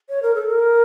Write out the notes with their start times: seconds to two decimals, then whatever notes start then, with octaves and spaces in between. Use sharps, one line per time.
0.09 C#5
0.23 A#4
0.35 A4
0.48 A#4